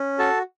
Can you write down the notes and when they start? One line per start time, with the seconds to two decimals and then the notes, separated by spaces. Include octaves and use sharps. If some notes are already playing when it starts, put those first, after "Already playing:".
Already playing: C#4
0.19 F#4 A4 A5